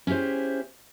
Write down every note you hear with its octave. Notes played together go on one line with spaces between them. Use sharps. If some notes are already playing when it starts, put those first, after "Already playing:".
C#4 E4 G4 G#4 C5